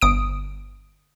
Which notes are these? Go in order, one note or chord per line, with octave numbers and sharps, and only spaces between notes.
G1 D#6 D7